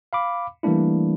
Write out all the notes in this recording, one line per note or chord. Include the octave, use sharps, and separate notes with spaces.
F5 B5 D6
E3 G3 A3 A#3 D4 E4